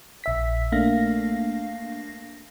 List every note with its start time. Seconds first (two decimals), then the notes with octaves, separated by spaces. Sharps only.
0.24 A#1 E5 B6
0.72 A3 A#3 D4 F5 A#6